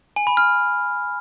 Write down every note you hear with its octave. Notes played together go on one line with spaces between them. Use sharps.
G#5
B5
F6